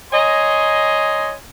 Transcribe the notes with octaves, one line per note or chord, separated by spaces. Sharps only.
C#5 D#5 G#5 A#5 C6